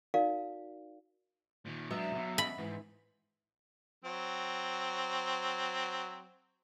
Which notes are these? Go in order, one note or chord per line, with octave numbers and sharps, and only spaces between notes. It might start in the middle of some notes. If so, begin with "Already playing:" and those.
D#4 F#4 A#4 D5 F5
A#2 D#3
F#3 G#3 B3 D4 E5
B1 B2
B5
G#2 E3
F#3 C4